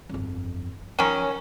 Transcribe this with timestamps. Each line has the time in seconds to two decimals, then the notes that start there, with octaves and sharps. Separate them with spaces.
0.09 G1 F2
0.99 D#3 F3 C#4